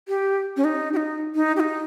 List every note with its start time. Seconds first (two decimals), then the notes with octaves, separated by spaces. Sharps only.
0.08 G4
0.57 C#4
0.64 D#4
0.93 G4
0.97 D#4
1.35 D#4
1.56 G4
1.60 D#4